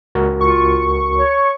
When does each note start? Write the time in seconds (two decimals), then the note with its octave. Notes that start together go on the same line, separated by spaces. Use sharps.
0.15 C#2 F#4 A#4
0.40 F4 C#6
1.16 C#5